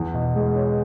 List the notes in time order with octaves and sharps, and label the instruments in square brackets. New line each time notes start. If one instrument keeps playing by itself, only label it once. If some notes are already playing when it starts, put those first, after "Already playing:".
Already playing: [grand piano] E2
B2
G#3
C#4